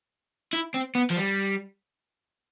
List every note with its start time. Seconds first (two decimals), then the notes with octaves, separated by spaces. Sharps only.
0.53 E4
0.74 C4
0.95 B3
1.10 F3
1.16 G3